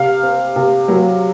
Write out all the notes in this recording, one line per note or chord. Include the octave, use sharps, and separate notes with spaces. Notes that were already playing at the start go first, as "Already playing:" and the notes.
Already playing: C3 F5 F6
C4
C3
F#3